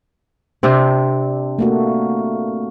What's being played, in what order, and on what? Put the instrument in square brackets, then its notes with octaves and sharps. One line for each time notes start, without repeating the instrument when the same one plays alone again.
[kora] C3 C4 [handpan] D4
[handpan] A3 A#3 F#4